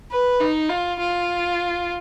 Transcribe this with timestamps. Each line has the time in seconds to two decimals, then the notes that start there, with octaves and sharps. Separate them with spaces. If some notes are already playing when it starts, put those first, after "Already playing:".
0.11 B4
0.40 D#4
0.70 F4
0.99 F4